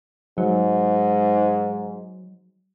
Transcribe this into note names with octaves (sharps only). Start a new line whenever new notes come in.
G#2 F#3